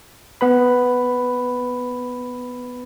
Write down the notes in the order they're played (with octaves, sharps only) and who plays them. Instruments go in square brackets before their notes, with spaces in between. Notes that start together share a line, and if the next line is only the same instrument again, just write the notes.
[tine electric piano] B3 B4 B5